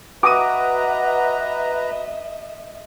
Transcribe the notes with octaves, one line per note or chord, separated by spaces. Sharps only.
F#4 B4 D#5 E5 A#5 D6 D#6 D#7